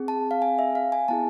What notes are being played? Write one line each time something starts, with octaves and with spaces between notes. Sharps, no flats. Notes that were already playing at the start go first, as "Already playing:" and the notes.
Already playing: C4 G#4
A5
F5
G#5
E5
F5
G#5
B3 E4 G#4 A5